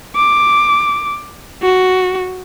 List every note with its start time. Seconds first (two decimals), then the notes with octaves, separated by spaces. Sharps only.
0.16 D6
1.62 F#4